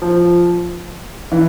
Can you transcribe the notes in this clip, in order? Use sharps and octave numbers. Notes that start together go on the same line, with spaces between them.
F3
E3